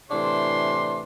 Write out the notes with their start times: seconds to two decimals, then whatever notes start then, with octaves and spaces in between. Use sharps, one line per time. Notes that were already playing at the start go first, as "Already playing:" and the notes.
0.11 A2 C3 E3 D4 C5 C6